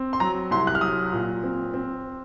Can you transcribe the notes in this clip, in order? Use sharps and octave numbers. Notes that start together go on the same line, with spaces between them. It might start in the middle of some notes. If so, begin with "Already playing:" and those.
Already playing: C4
C6
F#3 A#5
C2 C6
F#6
F6
F#3 D#6
A#2
C4
C4